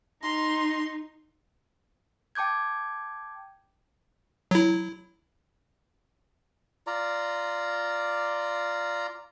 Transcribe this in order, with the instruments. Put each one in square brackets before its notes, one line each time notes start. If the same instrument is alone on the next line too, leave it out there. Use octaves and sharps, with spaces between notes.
[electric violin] D#4 [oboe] A#5 [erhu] C6
[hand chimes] G5 A5 D6 G6 G#6
[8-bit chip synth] F#3 E4
[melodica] F4 D5 A#5